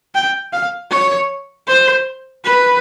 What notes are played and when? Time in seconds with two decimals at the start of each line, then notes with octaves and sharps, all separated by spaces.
0.15 G5
0.53 F5
0.91 C#5
1.68 C5
2.45 B4